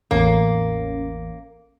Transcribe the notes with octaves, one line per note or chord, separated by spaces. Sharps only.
A1 E2 A#3 C#4